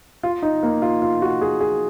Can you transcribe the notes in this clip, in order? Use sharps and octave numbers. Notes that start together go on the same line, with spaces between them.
F4
D#4
A#3
F4
F4
F#4
G#4
G#4